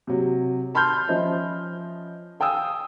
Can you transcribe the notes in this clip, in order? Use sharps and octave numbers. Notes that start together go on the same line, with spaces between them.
C3 F#3
A5 B5 C6 F6 G6
F3 C#4 C5 D#5 E5
F5 G5 G#5 D#6 E6